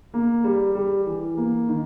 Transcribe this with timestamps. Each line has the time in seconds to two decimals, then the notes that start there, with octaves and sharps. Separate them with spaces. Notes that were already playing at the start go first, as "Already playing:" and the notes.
0.14 A#3
0.44 G3
0.75 G3
1.06 E3
1.37 A#3
1.68 D#3